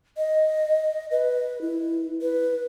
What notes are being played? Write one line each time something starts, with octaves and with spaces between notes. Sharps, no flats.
D#5
B4
E4
B4